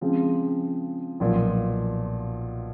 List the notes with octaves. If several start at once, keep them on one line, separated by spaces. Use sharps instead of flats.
C#3 F3 G#3 C4 F4
B1 A#2 F3